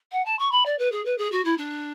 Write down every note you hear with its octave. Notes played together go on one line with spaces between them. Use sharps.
F#5
A5
C#6
B5
D5
B4
G#4
B4
G#4
F#4
E4
D4